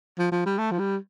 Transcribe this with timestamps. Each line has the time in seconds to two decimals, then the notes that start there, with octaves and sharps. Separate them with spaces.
0.19 F3
0.32 F3
0.46 G3
0.58 A3
0.71 F3
0.79 G3